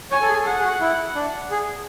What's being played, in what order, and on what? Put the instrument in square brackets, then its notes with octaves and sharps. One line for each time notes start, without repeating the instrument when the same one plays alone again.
[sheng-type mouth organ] C#5 [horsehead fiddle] G#5
[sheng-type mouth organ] A4
G#4
A4
[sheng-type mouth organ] G#4 [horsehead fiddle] F#5
[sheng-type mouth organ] G#4
F#4
E4
D4
G#4